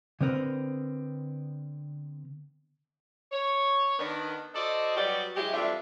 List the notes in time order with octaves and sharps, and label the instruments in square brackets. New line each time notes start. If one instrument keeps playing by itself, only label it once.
[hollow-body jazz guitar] D3 B3 C4 A#4 B4
[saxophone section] C#5
D#3 B3 D4
F#4 A4 C5 D5 D#5
F#3 G3 B3 F#4 G4 D5
F#3 G#3 E4 G4
F2 E3 G3 D4 F4 E5